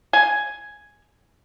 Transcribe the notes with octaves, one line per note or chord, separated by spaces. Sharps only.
G#5